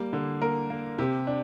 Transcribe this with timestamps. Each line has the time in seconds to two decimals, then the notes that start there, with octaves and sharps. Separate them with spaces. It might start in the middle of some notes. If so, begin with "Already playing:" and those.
Already playing: G3 A#3
0.13 D3
0.41 A#3 A#4
0.70 A#3
0.98 C3 G4
1.27 D4